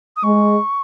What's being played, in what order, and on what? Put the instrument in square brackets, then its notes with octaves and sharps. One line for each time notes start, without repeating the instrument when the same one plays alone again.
[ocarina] D#6
[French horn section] G#3 [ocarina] C#6